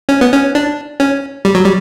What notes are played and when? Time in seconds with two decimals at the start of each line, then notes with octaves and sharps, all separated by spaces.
0.09 C#4
0.21 B3
0.32 C#4
0.55 D4
1.00 C#4
1.45 G3
1.55 F#3
1.65 G3